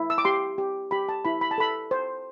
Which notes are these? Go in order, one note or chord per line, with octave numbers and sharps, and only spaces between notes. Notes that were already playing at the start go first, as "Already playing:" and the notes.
Already playing: E4
E6
D6
G4 C6
G4
G4 B5
A5
E4 B5
B5
A5
A4 B5
C5